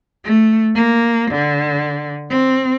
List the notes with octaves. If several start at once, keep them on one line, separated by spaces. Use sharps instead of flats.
A3
A#3
D3
C4